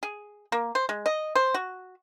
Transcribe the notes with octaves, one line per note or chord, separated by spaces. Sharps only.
G#4
A#3
C5
G#3
D#5
C5
F#4